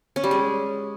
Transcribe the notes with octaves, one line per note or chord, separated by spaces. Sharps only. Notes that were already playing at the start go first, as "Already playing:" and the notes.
C#4
G3
G#3